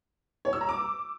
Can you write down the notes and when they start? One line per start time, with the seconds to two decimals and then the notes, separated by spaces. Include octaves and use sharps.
0.45 C#5
0.53 E6
0.61 A#5
0.69 D6